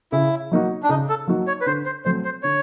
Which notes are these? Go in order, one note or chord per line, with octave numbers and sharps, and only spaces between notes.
C#3 E4
F#3 A#3 D#4 F#4
D4
C#3 D#4
A4
F#3 A#3 D#4 F#4
C#5
B4
D3 C5
C5
F#3 A3 C4 C5
C5
D3 C#5